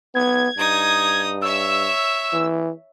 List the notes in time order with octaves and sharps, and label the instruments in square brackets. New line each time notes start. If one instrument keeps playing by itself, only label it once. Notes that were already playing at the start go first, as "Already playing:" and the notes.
[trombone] B3 [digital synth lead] G#6
[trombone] G2 [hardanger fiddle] D#4 D#6
[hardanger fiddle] C#5 E5 [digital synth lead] E6
[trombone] E3